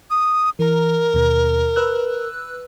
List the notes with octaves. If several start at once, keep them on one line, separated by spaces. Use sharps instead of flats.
D#6
E3 A#4 A#5
D#2 B2
B4 E6 F#6